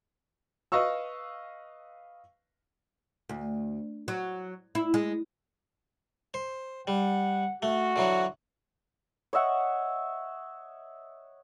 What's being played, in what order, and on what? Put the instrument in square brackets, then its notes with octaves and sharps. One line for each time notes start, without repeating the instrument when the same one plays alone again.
[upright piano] B4 D#5 F5 C#6 E6
[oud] D2
F#3
E4
G#3
[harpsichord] C5
[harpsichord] G3 [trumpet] F#5
[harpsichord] A3 [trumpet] F#4
[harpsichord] D3 E3 F#3
[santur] C#5 D#5 E5 F#5